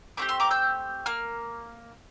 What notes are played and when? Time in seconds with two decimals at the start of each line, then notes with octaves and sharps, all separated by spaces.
0.17 A3 C4 G4 D6
0.29 C6 E6
0.40 A#5 D6
0.51 E6 G6
1.06 A#3 F6